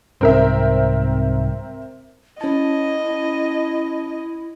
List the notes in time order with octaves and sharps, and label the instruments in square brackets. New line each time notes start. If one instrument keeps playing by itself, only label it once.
[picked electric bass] C2 G#2 [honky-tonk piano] C4 A#4 E5
[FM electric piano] C#4 A5 [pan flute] E4 [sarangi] D#5